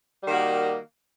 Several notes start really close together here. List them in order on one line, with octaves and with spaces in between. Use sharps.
G3 D#3 A#3 F#4